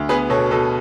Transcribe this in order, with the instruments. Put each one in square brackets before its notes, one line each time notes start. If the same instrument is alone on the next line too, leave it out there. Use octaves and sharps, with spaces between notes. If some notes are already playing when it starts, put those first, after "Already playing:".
Already playing: [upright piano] D2
B3 G#4 B4
B2 A4 C#5
B2 A4